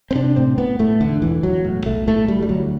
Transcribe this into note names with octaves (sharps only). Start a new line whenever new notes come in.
C4
C3 D4
A2 C4
A2 B3
A2 A3
E1 D3
E1 E3
E1 F#3
A2
B1 A3
A2 A3
D2 G3
G3
D2 F#3